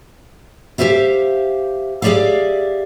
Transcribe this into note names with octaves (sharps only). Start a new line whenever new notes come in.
G4 A4 C5 E5 F5
G4 G#4 C#5 D5 E5 F5